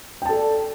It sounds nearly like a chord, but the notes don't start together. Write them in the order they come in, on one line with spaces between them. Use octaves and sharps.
G5 A5 A4 D5